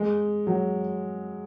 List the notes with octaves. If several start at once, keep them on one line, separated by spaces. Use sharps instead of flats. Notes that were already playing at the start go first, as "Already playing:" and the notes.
Already playing: G#3
F#3